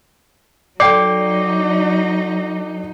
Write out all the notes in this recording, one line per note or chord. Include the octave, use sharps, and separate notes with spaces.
F#3 D#4 A4 D5 G5 D6 C7